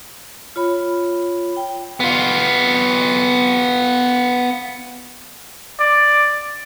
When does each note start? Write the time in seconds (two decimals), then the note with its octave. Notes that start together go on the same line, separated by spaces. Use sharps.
0.56 F4 C#5 B5
1.57 G5
2.00 B3 F4
5.80 D5